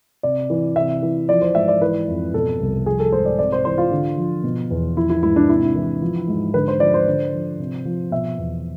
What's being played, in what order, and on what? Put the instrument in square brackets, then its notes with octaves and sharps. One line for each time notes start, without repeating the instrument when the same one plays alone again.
[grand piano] C3 D5
E3
C3 E5
E3
F3 D5
C5
G#2 E5
D5
E3 B4
F2
B2 A4
C2
F3 G#4
A4
G#2 C5
D5
C3 D5
C5
E3 C5
F4
D3
F3
B2
E2
F3 E4
E4
G#2 E4
D4
C3 E4
E3
F3
G#2
D3 B4
C5
F3 D5
C5
D3
F3
C3
F3
B2 E5
E2